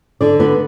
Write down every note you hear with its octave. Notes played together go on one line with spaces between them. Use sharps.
D3 D5
B3 B4